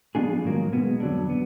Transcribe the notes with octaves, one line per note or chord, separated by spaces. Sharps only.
F3 B3 D4 F4 G#4
G#2 D#3 F#3 A#3
B2 G#3 B3
F2 D3 F#3 D4
B3